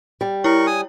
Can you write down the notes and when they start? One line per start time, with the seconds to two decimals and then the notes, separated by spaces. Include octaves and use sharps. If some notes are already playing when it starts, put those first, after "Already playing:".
0.21 G3
0.44 E4 A#4 C#5 C#6
0.67 G#5 D#6